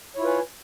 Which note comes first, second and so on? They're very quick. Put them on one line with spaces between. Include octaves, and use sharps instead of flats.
C#5 E4 F4 B4 G#5